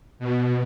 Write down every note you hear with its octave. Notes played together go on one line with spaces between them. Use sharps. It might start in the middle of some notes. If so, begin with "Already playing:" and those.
B2